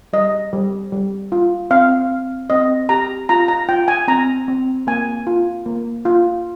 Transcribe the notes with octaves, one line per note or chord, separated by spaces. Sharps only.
G3 D#5
G3
G3
F4
C4 F5
C4
C4 D#5
G4 A#5
F4 A#5
A#5
F4 G5
G#5
C4 A#5
C4
A#3 G#5
F4
A#3
F4